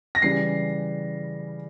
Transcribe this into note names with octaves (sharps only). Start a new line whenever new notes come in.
A#6
C#3 E3 G3 C7